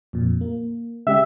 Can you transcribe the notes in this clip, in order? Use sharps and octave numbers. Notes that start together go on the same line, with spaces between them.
F2 A#2
A#3
C#3 G#3 G4 E5